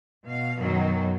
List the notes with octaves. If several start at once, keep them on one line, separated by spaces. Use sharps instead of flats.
B2 F5
F#2 B2 D#3 F#3